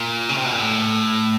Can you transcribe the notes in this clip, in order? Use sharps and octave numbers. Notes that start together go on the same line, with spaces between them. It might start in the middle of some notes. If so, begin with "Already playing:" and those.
Already playing: A#2
C#3
C3
B2
A#2
A2